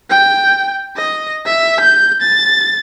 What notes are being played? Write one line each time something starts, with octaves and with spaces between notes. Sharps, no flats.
G5
D#5
E5
G6
A6